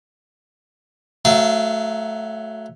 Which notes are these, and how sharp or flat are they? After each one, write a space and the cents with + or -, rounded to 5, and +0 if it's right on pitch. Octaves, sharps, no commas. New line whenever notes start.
F#3 +0 A3 -5 F5 -30